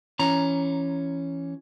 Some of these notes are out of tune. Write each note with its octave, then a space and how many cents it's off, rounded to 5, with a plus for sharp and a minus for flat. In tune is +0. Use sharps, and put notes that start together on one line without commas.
E3 +20 C#4 +0 A#5 +5